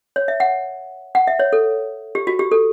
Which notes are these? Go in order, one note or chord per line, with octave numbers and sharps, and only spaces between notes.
C#5
E5
F#5
F#5
E5
C#5
A4
G4
F#4
G4
A4